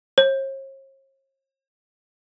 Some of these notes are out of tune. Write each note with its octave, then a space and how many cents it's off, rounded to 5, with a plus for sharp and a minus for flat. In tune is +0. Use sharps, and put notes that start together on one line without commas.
C#5 -45